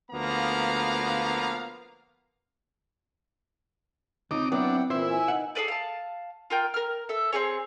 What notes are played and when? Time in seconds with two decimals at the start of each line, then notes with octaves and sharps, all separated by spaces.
0.11 D2 F3 A#3 B3 F5 A#5
4.31 C#2 C4 D#4 D6
4.52 F#3 B3 D4 E4 F#5 G5
4.90 A#2 E3 E4 C5
5.10 G#5
5.28 D#4 F#5
5.55 G#4 A4 B4 D5
5.68 F5 A5
6.50 F4 A#4 G5
6.74 A#4 F6
7.09 A4 E5
7.32 C4 D#4 G#4 C#5